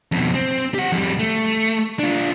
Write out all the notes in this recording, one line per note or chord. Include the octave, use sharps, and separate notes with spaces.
F2 B2
C4
G4 F#5
F2 G3
A3
D4 F4